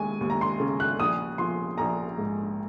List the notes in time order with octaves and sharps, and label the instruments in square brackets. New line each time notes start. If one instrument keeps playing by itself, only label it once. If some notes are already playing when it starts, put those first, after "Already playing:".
Already playing: [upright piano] D#2 G#3 G#5
D#2
A#5
C6
C#3
F#6
A#1 D#6
F3 C6
A#1 A#5
G#2